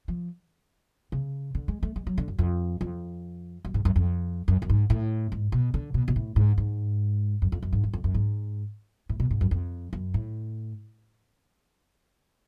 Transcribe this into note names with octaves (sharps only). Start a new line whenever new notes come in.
F3
C#3
D3
G#3
A3
G#3
F#3
D3
F#2
F2
F2
F#2
G#2
F#2
F2
F#2
F#2
G#2
A2
G#2
B2
D3
B2
B2
A2
G#2
G#2
F#2
F2
F#2
G#2
F#2
F2
F#2
G#2
A2
B2
G#2
F#2
F2
F#2
A2